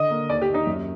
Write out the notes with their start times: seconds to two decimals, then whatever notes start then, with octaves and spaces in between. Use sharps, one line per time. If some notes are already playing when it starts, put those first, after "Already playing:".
Already playing: D3 D#5
0.10 A#3
0.30 D#2 D5
0.41 G4
0.48 D#2
0.54 D#4
0.67 F#2